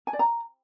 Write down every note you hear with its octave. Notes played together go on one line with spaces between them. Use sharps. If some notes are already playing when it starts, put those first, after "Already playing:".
G#5
D5
A#5